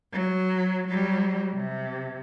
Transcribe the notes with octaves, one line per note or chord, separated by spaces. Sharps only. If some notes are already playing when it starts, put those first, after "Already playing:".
F#3
F#3 G3
C3